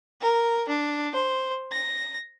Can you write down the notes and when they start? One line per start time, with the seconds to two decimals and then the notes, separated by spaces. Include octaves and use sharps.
0.21 A#4
0.69 D4
1.15 C5
1.72 A#6